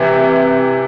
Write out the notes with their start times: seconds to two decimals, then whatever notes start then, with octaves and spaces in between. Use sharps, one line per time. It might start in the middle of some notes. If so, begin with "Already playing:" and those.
Already playing: C3 E3 B4 E5 G5
0.21 B4
0.47 B4